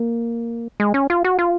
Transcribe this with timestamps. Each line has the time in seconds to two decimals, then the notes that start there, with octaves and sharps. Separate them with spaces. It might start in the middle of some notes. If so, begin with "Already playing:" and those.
Already playing: A#3
0.80 G#3
0.94 C#4
1.10 F4
1.24 F#4
1.39 F4